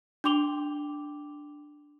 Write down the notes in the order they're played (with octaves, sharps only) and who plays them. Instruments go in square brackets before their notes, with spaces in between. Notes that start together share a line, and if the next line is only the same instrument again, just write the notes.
[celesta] D4 G5 C6 D6 F7 G7